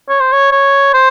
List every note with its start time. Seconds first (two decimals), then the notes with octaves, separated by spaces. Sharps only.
0.09 C#5
0.20 C5
0.33 C#5
0.52 C#5
0.94 C5